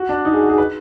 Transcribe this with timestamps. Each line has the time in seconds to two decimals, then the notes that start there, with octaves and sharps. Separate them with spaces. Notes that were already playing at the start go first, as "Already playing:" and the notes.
Already playing: F#4
0.09 D4
0.25 D#4
0.33 G#4
0.42 F#4
0.50 G#4
0.58 B4